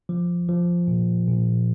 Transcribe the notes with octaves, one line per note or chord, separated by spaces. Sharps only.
F3
F3
A#2
A#2